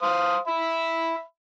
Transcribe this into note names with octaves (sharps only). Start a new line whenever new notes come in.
C5 F5 D#6
E5 B5